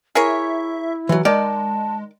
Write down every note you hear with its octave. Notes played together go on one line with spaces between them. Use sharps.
E4 G#4 A#4 C#5 E5
E3 F#3
D#3 G#3 D5 A5